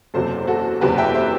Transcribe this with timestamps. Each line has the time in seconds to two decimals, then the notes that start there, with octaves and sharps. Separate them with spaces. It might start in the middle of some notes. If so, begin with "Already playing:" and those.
0.14 F#1 E2 C3 F#3 A4 C5
0.47 F#4 A4
0.81 F#1 E2 C3 F#3 G4 B4
0.98 E5 G5
1.15 C5 E5